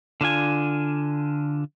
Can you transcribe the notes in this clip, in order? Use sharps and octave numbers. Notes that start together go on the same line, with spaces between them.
D3 D4 F4 G#5